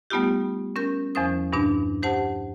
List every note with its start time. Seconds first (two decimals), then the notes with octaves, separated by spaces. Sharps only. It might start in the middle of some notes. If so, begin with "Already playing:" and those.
0.10 G3 A3 B3 D#4 F4 G4
0.76 C#4 A#4 G6
1.15 E2 F3 C#4 C5 D#6
1.52 E2 G2 B2 D4
2.03 G4 C5 F#5 A5